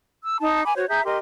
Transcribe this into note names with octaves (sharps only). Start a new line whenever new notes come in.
E6
D#4 A5
G#5 B5 D6
F#4 C5 C#5
G#4 E5 A#5 G6
G4 A#4 D#5 C6